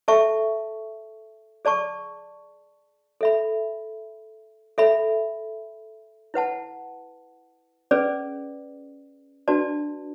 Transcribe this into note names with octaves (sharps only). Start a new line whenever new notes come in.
A4 E5 A5 C#6
G#4 D5 A5 C#6
A4 E5 B5
A4 E5 B5
E4 B4 F#5 A5
C#4 G#4 B4 D5
D4 F#4 B4 D5 A5